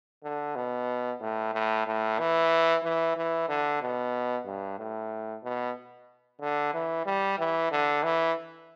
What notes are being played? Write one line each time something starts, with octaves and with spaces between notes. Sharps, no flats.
D3
B2
A2
A2
A2
E3
E3
E3
D3
B2
G2
A2
B2
D3
E3
G3
E3
D3
E3